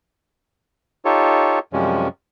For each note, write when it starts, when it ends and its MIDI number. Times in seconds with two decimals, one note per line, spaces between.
1.05 1.59 63
1.05 1.59 65
1.05 1.59 67
1.05 1.59 69
1.05 1.59 73
1.73 2.08 42
1.73 2.08 48
1.73 2.08 53
1.73 2.08 55
1.73 2.08 56
1.73 2.08 61